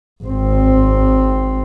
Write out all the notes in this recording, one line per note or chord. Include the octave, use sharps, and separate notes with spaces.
G#1 C4